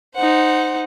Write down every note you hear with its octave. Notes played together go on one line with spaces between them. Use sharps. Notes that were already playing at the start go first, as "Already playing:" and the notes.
D#4 C5 F#5